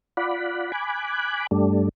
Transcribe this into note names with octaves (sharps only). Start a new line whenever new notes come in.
F4 D5 F#5 B5
G#5 B5 D6 F#6
G2 G3 A3 D4